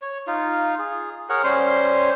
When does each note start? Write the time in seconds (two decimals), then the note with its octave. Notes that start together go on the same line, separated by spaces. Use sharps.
0.02 C#5
0.27 D#4 F4
0.79 G#4
1.30 G#4 A#4 C#5 F#5
1.44 G3 C#4 C5 C6